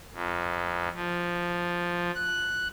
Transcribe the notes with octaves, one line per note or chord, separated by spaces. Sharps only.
F2
F3
F#6